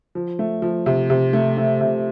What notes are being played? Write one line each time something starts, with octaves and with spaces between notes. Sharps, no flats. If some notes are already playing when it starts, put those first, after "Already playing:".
F3
A3
F3
C3
C3
A3
A3
C3